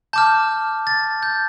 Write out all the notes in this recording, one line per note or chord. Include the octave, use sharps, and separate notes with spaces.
A5 D6 F6 G6
A6
G6